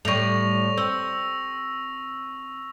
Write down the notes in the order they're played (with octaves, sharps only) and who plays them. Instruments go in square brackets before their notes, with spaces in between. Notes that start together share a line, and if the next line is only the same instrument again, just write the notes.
[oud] A2 G3 [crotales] C#6 A#6 F7
[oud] C4 [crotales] E6